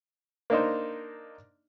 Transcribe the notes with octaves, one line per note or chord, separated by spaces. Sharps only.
A#3 D4 D#4 C5